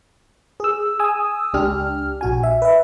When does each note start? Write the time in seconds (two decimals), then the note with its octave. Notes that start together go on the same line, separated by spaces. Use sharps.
0.60 G#4 E6
0.99 G#5 D#6 E6
1.54 C#2 D4 G4 F6
2.21 A#1 F#4 G#5
2.43 E5
2.62 B4 E5